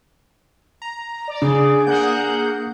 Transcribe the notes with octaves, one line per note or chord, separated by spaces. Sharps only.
A#5
D5
C#3 D4 G#4
A#3 F#5 G6